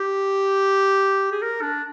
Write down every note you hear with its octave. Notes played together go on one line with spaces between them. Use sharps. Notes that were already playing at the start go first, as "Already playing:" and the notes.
Already playing: G4
G#4
A#4
D4